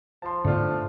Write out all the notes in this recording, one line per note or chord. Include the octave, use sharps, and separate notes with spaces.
F3 A5 C6
G#2 D3 A3 B3 D4 F4